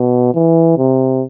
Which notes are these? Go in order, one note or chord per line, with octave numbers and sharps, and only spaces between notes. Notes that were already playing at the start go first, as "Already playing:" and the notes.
Already playing: B2
E3
C3